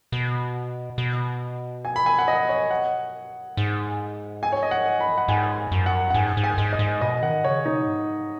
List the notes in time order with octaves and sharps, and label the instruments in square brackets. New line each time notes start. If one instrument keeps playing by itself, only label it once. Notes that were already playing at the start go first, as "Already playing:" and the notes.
[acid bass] B2
B2
[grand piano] G#5
B5
G#5
F#5
D#5
C#5
F#5
[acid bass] G#2
[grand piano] G#5
C#5
D#5
F#5
B5
F#5
[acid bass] G#2 [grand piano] G#5
[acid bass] F#2
[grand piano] F#5
F#5
[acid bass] G#2 [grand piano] G#5
[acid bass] G#2
[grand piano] G#5
[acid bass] G#2
[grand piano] D#5
[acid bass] G#2
[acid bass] B2 [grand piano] D#5
[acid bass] D#3 [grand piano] F#5
[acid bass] C#3 [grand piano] C#5
[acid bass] B2 [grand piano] D#4
[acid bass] G#2